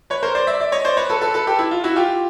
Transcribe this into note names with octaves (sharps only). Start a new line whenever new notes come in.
B4 C#5
A#4 C5
C5 D5
D5 E5
D5 E5
C#5 D#5
C5 D5
B4 C#5
A4 B4
A4 B4
A4 B4
G4 A4
E4
F4
E4 F#4
F4 G4